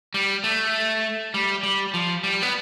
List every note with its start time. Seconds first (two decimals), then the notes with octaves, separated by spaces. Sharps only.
0.14 G3
0.44 A3
1.34 G3
1.63 G3
1.94 F3
2.24 G3
2.42 B3